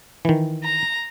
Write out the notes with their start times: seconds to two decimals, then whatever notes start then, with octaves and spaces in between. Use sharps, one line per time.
0.25 D#3 E3
0.64 A#5